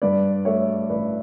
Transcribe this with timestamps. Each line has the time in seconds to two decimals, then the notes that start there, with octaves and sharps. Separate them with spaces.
0.02 G2 B4 D5
0.45 A3 C#5 E5
0.89 A1 B4 D5